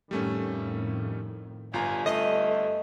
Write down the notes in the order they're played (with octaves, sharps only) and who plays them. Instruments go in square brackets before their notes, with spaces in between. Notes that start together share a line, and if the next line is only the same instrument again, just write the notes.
[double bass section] F2 A2 D#3 [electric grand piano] G3 A3 C#4
[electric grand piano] G1 F4 A#5 [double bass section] G2 [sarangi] G#5
[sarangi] A3 [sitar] D#5